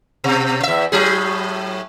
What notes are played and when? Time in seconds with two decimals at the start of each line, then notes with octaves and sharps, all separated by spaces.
0.24 B2
0.63 E2 E5
0.92 A2 F#3 G#4